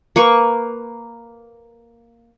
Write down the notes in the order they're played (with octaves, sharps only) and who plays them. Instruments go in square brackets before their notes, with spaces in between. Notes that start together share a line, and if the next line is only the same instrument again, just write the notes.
[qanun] A#3 B4 C#6